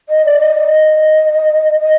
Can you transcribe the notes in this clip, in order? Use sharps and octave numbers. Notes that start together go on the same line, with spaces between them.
D#5
D5
D#5
D#5
D#5